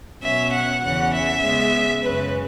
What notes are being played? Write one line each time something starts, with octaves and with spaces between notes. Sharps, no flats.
B2 F#3 C#4 E5
F#5
E2 C#3 E3 C#4 F#5
E5
C#3 G#3 B3
F#2 C#3 G#3 C#4 B4